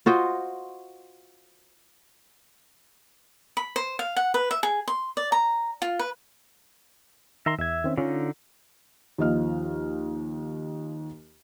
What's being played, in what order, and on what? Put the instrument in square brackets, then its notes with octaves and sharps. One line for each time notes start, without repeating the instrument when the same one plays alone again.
[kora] F4 F#4 C5 D#5
[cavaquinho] B5
C5
F5
F#5
B4
E5
G#4
C6
D5
A#5
F4
B4
[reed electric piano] D#3 [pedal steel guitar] E5 A#5 C6
[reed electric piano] E2 G#6 [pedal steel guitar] E5
[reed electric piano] D#3 C4 C#4
[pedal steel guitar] D3 D#4 [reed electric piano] C#4 F4
[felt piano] D#2 F3 D#5 F6